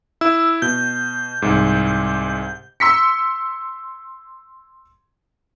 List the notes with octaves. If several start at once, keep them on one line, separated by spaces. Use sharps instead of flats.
E4 E6
B2 G6
C2 G#2
C6 E6 B6 C#7